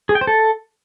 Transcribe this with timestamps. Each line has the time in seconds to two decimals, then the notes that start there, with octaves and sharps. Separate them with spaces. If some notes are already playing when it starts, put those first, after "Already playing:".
0.09 G#4
0.15 G5
0.21 C5
0.27 A4